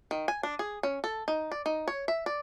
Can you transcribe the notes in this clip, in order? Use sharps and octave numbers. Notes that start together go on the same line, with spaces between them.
D#3
G#5
D4
G#4
C#4
A4
D#4
D5
D#4
C#5
E5
D5